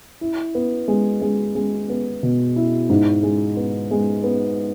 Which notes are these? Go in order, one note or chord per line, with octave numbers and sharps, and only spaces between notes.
E4
B3
G#3
G#3
G#3
B3
B2
E4
G#2
G#3
B3
G#3
B3